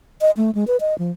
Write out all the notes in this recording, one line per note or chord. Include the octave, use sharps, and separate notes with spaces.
D#5
A3
G#3
B4
D#5
F3